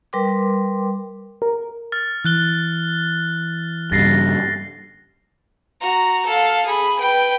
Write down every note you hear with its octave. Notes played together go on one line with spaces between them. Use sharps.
G3 A#4 B4 G5 C6 D6
A#4
F6 A6
E3 F6 F#6 G7
G2 C#3 A6 A#6 C7
F#4 A#5
A4 F5
G#4 B5
B4 G5